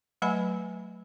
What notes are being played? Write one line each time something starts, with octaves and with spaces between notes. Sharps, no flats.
F#3 A3 B4 D#5 G#5 B5